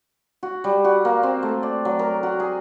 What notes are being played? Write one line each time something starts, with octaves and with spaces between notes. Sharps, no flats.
F#4
G3
F#4
A#3
C4
A3
D5
F#3
A#4
F#4
G#4